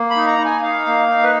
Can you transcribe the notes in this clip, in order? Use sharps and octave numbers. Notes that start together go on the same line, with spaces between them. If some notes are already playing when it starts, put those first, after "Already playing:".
Already playing: A#3
B5
D#4
A#5
D#4
G#5
D#4 F5
A#3
D#4
B4